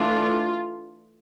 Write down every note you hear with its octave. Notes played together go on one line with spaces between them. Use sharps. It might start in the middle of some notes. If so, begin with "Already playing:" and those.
Already playing: E3 A3 D4 F4